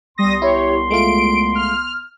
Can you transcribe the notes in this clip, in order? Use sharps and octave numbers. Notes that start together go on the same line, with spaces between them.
C2 G3 B3 C6 D#6 A#6
E4 G4 C#5
G#3 A3 F4 D7
F6